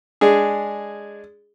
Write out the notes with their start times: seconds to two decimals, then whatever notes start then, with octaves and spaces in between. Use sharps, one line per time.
0.21 G#3 D4 G#4